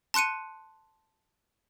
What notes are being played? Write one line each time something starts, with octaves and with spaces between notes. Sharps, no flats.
A5 C6 F#6 C#7 D#7